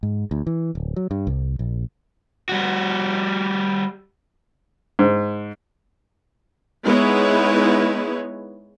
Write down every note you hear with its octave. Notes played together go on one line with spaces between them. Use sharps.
G#2
D2
E3
D1
F#3
G2
C2
A#1
G3 F#4
G#2
G#3 B3 D#4 E4 B4 C#5